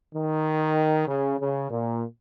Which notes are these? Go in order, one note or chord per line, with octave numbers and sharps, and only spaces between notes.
D#3
C#3
C#3
A#2